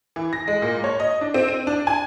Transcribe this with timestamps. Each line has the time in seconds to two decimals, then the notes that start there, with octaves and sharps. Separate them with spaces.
0.16 E3
0.33 A#6
0.48 G#3
0.62 A#2
0.84 C#5
1.00 D#5
1.21 D4
1.34 C4
1.48 D#7
1.67 D4
1.87 G#5